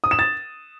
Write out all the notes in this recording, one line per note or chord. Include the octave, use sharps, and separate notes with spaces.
D#6
E7
A6